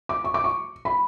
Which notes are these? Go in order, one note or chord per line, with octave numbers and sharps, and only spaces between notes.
D6
C#6
D6
C#6
B5